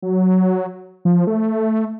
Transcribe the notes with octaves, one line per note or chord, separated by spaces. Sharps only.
F#3
F3
A3